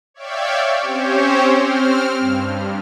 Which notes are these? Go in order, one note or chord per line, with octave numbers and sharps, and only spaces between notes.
C#5 D5 E5 F5 G5
C4 C#4 G4 C5 C#5
C4 F6
G2